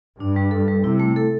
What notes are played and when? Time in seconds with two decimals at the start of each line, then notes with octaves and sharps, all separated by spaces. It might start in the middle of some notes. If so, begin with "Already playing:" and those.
0.19 G2 D4
0.36 G3
0.51 A4
0.68 G3
0.84 C3 E4
1.00 A3
1.16 A4